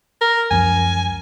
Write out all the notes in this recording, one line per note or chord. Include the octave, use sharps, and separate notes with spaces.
A#4
C#2 F#2 F3 G#5